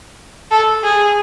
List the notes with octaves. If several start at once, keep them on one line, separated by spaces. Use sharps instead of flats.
A4
G#4